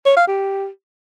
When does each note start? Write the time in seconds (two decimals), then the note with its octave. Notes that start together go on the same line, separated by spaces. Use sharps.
0.05 C#5
0.16 F5
0.27 G4